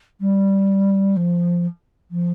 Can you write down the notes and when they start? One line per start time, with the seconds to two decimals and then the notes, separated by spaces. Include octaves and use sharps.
0.21 G3
1.16 F3
2.11 F3